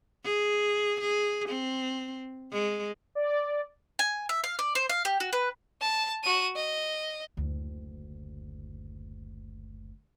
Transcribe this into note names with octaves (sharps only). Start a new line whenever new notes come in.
G#4
G#4
C4
G#3
D5
G#5
E5
F5
D5
C5
F5
G4
F#4
B4
A5
F#4 D#7
D#5
F#1 D2